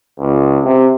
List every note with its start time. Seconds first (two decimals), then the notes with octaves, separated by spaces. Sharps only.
0.20 C#2
0.64 C3